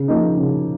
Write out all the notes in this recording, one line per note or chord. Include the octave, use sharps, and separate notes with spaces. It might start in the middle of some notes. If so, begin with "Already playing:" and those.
Already playing: C#3
F3 A#3 D#4
C#3